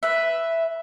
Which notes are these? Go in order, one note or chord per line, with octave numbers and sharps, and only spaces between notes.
B4 E5